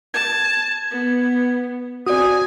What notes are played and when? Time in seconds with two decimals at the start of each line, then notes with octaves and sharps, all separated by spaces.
0.14 A5 G#6
0.91 B3
2.06 C4 F#4 D5 G#5 D#6